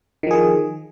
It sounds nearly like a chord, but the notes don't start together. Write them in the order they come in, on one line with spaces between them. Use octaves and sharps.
D#3 F3 G#4